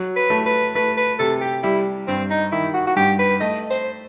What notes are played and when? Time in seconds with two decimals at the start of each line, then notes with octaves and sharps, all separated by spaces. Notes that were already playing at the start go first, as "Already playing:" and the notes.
Already playing: F#3
0.16 B4
0.30 A3
0.46 B4
0.75 A3 B4
0.97 B4
1.19 C3 A4
1.41 G4
1.63 G3 E4
2.08 G2 C4
2.30 D#4
2.52 D#3 E4
2.74 F#4
2.87 F#4
2.96 G2 G4
3.19 B4
3.40 A3 D#5
3.70 C5